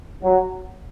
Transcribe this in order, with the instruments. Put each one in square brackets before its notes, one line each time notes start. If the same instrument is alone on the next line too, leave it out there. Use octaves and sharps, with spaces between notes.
[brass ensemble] F#3